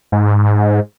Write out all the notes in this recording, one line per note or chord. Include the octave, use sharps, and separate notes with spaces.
G#2